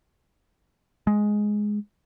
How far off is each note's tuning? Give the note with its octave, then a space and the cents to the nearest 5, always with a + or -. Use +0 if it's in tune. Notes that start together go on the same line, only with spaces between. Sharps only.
G#3 +5